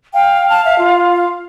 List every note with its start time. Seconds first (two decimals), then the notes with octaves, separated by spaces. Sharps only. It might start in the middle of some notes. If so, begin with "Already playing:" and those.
0.14 F5 G5
0.50 A5
0.65 E5
0.79 F4